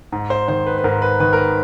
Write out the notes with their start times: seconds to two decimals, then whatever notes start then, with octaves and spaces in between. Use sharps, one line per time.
0.12 G#2
0.30 C5
0.48 D#3 C5
0.67 B4
0.78 B4
0.84 G#2 A#4
1.02 B4
1.20 D#3 B4
1.33 A#4
1.38 B4